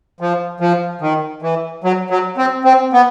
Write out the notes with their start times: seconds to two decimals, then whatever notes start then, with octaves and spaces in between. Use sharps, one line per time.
0.21 F3
0.60 F3
1.01 D#3
1.42 E3
1.84 F#3
2.10 F#3
2.38 C4
2.65 C4
2.93 B3